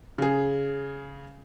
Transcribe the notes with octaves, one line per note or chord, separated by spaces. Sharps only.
C#3 G#4